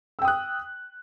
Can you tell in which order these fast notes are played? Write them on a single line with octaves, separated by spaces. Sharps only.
E6 G5 D#6 F#6